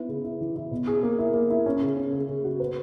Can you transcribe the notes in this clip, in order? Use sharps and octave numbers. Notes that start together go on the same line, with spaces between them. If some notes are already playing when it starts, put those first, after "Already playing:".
Already playing: B3 D#4 E4
C#3
E4
E3
E4
B2
G#4
A#3
E4
A#3
E4
C#4
C#3
C#4
C#3
C#3
F#4
B4